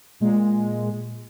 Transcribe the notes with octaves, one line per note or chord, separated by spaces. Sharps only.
A#2 G#3